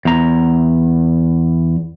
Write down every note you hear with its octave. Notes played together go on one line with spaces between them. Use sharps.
E2 A#5